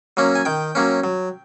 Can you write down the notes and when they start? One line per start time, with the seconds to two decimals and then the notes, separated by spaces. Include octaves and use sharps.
0.17 F#3 A#3 C#4
0.35 G#5
0.45 D#3 G5
0.75 F#3 A#3 C#4
1.04 F#3